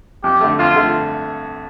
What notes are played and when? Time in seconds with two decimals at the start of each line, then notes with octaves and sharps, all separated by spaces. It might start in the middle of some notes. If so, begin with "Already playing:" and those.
0.23 F2 G4
0.41 D3 A3
0.59 F2 F4
0.76 D3 A3